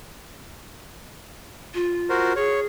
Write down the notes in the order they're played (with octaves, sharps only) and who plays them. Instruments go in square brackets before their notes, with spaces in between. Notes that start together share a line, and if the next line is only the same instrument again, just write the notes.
[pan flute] F4
[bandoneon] F#4 A#4 C5
[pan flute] G#4 [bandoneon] C#5